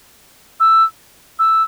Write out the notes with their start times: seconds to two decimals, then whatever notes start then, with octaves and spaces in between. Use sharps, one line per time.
0.60 E6
1.39 E6